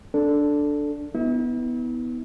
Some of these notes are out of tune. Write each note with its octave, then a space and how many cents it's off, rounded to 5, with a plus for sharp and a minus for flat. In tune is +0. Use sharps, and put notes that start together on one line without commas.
D4 -5 A4 +0
B3 +0 E4 -40